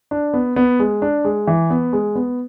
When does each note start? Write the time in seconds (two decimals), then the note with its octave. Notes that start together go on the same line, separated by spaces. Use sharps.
0.11 D4
0.34 B3
0.56 B3
0.79 G#3
1.02 D4
1.25 G#3
1.47 E3
1.70 B3
1.93 G#3
2.15 B3